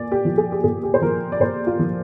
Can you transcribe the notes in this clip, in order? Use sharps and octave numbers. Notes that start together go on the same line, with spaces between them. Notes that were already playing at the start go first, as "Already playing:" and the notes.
Already playing: A#2 D5 G#5
G4
F3
G#4
G4
A#2 G#4
G4
C5
F3 A#4
D5
A#2 C5
F4
F3